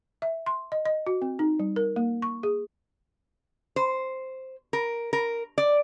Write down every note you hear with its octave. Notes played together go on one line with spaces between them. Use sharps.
E5
C6
D#5
D#5
F#4
C4
D#4
G3
A#4
A#3
C#6
G#4
C5
A#4
A#4
D5